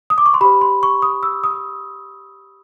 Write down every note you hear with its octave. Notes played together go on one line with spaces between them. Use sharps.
D#6
D6
C#6
C6
G4 C5 B5
C6
C#6
D#6
E6
D#6